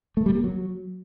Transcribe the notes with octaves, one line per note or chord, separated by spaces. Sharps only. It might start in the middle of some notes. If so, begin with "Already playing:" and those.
A3
G3
A#3
F#3